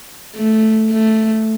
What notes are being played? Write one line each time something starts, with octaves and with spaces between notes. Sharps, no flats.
A3
A3